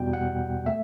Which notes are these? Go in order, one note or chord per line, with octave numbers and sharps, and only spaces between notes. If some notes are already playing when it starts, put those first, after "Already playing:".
Already playing: E2 B2 G3 G5
F#5
A3 E5